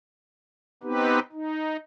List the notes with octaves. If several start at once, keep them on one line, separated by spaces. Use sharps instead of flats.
B3 C4 D#4 G4 B4
D#4